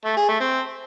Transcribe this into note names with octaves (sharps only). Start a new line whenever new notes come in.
A3
G#4
A3
C4